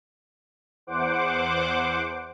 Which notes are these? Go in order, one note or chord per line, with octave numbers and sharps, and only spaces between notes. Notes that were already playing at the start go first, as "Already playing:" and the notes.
E2 C5 F#5 D6